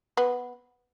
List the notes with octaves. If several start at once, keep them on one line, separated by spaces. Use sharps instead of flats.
B3